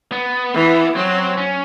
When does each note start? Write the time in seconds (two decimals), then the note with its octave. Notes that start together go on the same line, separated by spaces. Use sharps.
0.12 B3
0.54 E3
0.95 F#3 C4
1.37 C#4